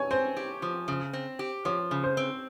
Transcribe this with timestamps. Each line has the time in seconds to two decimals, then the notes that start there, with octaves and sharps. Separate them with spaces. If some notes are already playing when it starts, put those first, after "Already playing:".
Already playing: C#5 G#5
0.11 C4 C5
0.37 G4
0.62 F3
0.88 C#3
1.13 C4
1.39 G4
1.65 F3 C#5
1.91 C#3
2.04 C5
2.17 C4